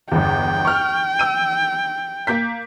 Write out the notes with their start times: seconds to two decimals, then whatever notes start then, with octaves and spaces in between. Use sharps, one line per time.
0.12 G1 E2 G5
0.65 C#6 F6
1.19 E6 D#7
2.27 A#3 G6 B6